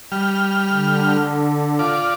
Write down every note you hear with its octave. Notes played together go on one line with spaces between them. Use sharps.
G3 F6
D3
F4 D5